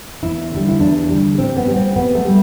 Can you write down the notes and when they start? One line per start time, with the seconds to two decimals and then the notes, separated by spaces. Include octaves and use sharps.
0.23 E2 E4
0.52 D3 G3
0.69 E4
0.80 E2 D4
1.09 D3 G3
1.38 A2 C4
1.57 B3
1.67 G3
1.76 C4
1.96 A2 B3
2.15 A3
2.25 G3